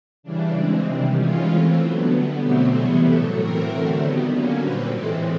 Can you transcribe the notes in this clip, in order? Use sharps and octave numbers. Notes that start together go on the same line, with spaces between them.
C#3 E3 G3 D4
E3 G#3 C4
C3 D#3 G3
E3 G#3 C#4 F4
E3 A3 C4
D3 F#3 B3
D3 G3 B3
B2 F#3 A3 C4 G4
C3 E3 G3 B3 G#4
A2 F#3 A3 A4
E3 A3 C4 A#4
D3 F#3 A3 C4
D#3 G3 B3
D3 F#3 A#3 C#4
A#2 G3 C4 B4
A2 E3 G#3 C4 A4